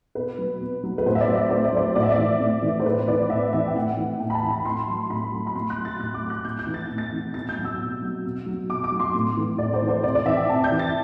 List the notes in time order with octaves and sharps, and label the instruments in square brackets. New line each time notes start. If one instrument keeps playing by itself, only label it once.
[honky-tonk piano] B2 B4
F#3
B2
F#3
B4
A2 C5
E5
D5
F#3
E5
A2 C5
D5
F#3 C5
A2 D5
E5
D5
E3
A2
E3
C5
A2 B4
E3 D5
A2 E5
E3 E5
G5
A2 F#5
E3
A2 G5
B5
A5
E3
B5
A2 C6
F#3
A2 B5
F#3
B5
A2 C6
F#6
F#3
A6
A2 F#6
D6
F#3
F#6
A2 G6
G6
E3
A6
A2
A6
E3
B2 A6
G6
F#3
E6
B2
F#3
B2
F#3
B2 D6
D6
F#3
C6
A2
E3
A2 D5
C5
E3
C5
C3 D5
D5
E3 E5
G5
C3 A5
G6
E3
A6